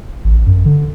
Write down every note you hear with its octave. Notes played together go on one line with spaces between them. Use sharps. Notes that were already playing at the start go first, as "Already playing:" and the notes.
A1
F#2
D3